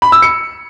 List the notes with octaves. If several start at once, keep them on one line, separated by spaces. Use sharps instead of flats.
B5
E6
C#7